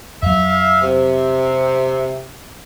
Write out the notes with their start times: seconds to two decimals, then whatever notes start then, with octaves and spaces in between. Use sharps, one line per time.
0.22 F2 F#3 E5 F5
0.82 C3